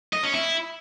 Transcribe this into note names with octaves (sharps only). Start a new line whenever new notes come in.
D#5
C#4
E4